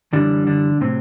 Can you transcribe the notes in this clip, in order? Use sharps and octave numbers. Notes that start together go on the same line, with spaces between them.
F#2 D3 E3 G3 D4
D3 D4
A2 C3 F#3 C4